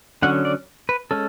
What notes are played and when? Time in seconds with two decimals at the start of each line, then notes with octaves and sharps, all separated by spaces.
0.22 D3 F#3 C#4 F#5
0.45 D5
0.89 B4
1.11 G#3 C#4 A4